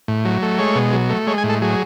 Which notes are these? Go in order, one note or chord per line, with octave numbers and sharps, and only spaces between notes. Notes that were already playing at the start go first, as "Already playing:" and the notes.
A2
F#3
A3
G#3 C#5
B2
F#3
A3
G#3 C#5
G#5
A2
A4
F#3 G#4